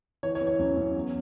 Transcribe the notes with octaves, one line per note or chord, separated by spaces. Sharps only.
E3 C#5
C#5
E3
C#5
F#2
F#2
E2